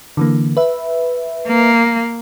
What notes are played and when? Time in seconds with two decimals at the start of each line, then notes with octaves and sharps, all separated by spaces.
0.17 D3 E3 A#3
0.57 B4 E5
1.48 A#3